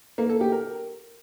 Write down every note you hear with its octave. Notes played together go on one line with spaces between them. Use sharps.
A#3
A4
G4
A#4